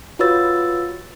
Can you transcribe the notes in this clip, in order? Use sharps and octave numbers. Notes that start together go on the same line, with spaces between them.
F4 F#4 B4 C#5 E6 A6